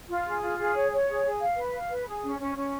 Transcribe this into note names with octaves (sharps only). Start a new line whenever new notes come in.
F4
G#4
F4
G#4
C#5
C#5
G#4
G#4
F5
B4
F5
B4
G#4
C#4
C#4
C#4